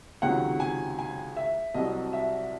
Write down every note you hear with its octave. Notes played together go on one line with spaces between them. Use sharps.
C#2 C3 D#3 F#3 F#5
G#5
G#5
E5
C2 C3 F#3 D#5
E5